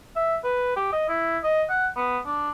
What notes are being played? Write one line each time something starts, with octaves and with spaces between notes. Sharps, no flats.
E5
B4
G4
D#5
E4
D#5
F#5
B3
D4